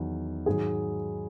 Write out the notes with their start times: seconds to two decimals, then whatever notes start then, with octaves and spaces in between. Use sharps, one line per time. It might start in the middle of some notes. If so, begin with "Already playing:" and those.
Already playing: E2 D#3 F#3
0.46 G#2 D#3 F#3 G#4